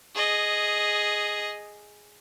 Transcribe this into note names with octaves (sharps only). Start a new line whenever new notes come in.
G#4 D#5